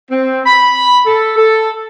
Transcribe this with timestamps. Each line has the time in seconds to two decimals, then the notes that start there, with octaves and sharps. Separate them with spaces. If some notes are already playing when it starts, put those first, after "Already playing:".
0.10 C4
0.46 B5
1.06 A4
1.37 A4